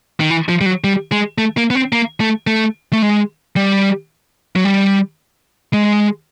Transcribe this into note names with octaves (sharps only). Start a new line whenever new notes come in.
D#3
E3
F3
G3
F#3
G3
G#3
A3
A#3
B3
C4
A#3
A3
A3
A3
G#3
G3
F#3
G3
G#3